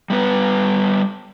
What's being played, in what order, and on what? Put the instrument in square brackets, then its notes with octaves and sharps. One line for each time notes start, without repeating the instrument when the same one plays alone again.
[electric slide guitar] G3 B3 B4